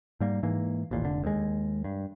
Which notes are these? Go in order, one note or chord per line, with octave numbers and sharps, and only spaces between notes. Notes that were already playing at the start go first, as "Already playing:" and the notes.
G#2 G3 A#3
G#2 E3 A#3
A1 D#2 A#2
F1 D3
D#2 G#3
G2